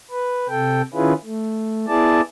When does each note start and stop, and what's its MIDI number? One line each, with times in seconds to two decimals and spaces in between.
0.11 0.47 71
0.49 0.82 48
0.49 0.82 69
0.49 0.82 79
0.94 1.13 51
0.94 1.13 61
0.94 1.13 64
0.94 1.13 65
0.94 1.13 68
0.94 1.13 71
1.25 1.86 57
1.88 2.21 59
1.88 2.21 64
1.88 2.21 68
1.88 2.21 74
1.88 2.21 81